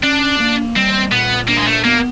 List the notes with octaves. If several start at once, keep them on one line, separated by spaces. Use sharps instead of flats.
C#4 D4
A#3
G3 C4
A#2 B3
A#3 D4
G#3
A3
A#3 B3